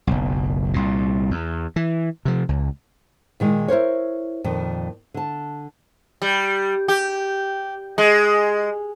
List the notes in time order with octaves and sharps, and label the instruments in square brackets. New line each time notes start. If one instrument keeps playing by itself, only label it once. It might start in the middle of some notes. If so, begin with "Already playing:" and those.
[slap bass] F#1 B1
C2 A#2
E2
E3
C3 F3
C#2
[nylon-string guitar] A#2 D#3 G#3
E4 A#4 C5 C#5
F2 A#2 D#3
D3 A5
[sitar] G3
G4
G#3